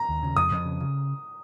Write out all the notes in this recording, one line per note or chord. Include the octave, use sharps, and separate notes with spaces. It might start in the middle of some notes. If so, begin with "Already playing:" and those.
Already playing: A#5
D#2
C#3
F2 D#6
F2
C#3
C#3